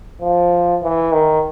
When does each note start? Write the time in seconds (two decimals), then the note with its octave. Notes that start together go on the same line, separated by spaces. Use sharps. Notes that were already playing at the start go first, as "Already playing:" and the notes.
0.22 F3
0.83 E3
1.12 D#3